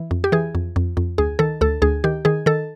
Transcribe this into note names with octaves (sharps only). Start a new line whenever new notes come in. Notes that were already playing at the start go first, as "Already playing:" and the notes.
Already playing: E3
F2
G4
E3 G#4
F2
F2
F2
D2 G#4
D#3 A4
D2 A4
D2 G#4
D#3 G4
D#3 G#4
D#3 A4